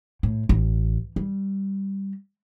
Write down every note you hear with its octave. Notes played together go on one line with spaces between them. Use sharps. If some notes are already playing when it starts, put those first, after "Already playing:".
A2
A1
G3